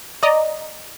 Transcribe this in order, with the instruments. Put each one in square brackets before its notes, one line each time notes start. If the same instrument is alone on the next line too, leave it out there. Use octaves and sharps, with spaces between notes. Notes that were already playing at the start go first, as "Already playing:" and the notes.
[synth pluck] D5 D#5 A#5